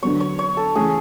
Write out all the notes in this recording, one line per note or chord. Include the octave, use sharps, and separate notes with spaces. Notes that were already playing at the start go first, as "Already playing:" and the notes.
D3 F#3 B3 C#5
C#5
C#5
A4
C#3 E3 A3 C#4 G#4